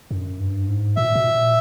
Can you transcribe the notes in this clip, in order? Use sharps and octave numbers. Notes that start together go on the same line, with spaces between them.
F#2
G2
G#2
A#2 E5
B2
A#2